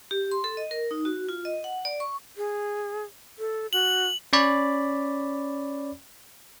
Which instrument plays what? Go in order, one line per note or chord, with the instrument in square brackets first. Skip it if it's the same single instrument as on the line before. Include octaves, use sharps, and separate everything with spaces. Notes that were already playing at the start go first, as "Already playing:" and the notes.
[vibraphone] G4
C6
A4
D#5
A#4
D#4
F#4
F4
D#5
F#5
D5
C#6
[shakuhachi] G#4
A4
[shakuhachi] F#4 [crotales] F#7
[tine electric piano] C#4 C#5 D5 B5